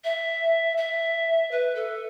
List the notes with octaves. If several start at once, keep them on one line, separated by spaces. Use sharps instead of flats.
E5
E5
B4
A4